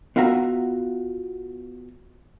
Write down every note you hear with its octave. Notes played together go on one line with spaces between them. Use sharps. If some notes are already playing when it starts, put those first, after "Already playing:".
B3 F4 F#4 E5 A#5